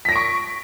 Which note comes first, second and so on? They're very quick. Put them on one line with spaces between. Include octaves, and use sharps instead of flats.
B6 A#6 D7 C#6